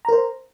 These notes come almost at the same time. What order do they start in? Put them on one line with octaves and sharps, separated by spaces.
A#5 A#4 C5